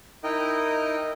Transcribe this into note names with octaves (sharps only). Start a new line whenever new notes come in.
D#4 E4 A#4 D#5 G5